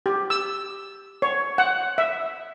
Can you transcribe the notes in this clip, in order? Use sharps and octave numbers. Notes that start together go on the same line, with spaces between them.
G4
E6
C#5
F#5
E5